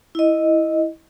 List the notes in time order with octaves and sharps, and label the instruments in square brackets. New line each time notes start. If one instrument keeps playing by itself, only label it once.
[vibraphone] E4 D#5